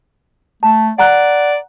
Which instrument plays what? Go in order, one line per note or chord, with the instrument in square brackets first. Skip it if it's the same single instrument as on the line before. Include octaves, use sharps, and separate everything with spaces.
[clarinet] A3 [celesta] A5
[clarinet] D5 [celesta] F#5 A#5 F#6